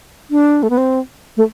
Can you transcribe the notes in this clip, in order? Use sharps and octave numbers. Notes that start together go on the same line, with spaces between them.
D4
A3
B3
C4
A3